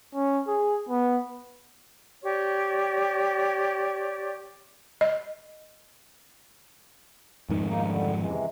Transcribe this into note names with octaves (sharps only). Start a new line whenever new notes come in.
C#4
G#4
B3
G4 C#5 D5 C#6
D#5
F2 G#2 D#3
A#3 D#4
D3 G3
C3 E3 G#3